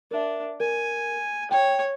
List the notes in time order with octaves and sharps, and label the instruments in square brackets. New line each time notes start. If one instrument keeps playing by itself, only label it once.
[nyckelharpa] D4 [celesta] A#4 E5
[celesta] A#4 [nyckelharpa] G#5
[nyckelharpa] C#5 [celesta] G5